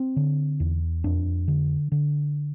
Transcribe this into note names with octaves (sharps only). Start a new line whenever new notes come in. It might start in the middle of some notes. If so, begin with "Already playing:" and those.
Already playing: C4
D3
E2
F2 D4
D3
D3